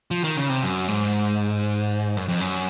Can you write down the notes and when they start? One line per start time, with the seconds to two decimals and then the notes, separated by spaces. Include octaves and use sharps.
0.11 F3
0.24 D#3
0.37 C#3
0.49 C3
0.63 F#2
0.88 G#2
2.17 F#2
2.28 F2
2.40 F#2